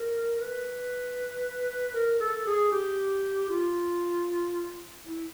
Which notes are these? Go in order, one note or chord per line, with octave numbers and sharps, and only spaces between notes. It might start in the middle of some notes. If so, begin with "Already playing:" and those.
Already playing: A#4
B4
A#4
A4
G#4
G4
F4
E4